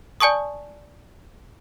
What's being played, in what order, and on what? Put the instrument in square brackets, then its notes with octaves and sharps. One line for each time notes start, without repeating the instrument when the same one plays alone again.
[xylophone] D5 G#5 A5 C#6 D#6